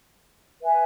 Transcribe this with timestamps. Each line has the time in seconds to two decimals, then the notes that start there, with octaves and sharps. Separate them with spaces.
0.61 B4 E5 G#5